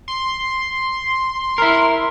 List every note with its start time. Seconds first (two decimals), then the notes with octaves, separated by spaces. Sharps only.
0.08 C6
1.58 E4 A#4